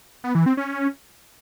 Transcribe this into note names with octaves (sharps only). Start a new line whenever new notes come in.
B3
E3
C4
C#4